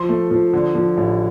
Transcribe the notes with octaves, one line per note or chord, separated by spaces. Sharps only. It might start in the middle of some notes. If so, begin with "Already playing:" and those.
Already playing: F3 C6
A3
F3
D3
F3
A1